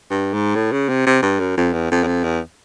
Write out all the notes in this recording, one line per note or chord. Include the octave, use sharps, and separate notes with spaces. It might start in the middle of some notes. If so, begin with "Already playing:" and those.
G2
G#2
A2
C#3
C3
C3
G2
F#2
F2
E2
F2
E2
F2
E2